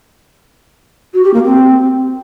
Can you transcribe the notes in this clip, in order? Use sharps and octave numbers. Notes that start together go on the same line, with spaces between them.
F#4
G4
A#3
C4